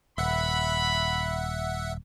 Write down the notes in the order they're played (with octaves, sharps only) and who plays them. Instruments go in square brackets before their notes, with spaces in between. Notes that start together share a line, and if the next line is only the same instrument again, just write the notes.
[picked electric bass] D#1 [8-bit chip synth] E5 F#5 [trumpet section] B5